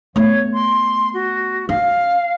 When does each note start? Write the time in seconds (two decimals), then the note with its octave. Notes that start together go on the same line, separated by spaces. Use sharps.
0.16 A3 B3 C#5
0.53 C6
1.14 F#4
1.69 C#4 F5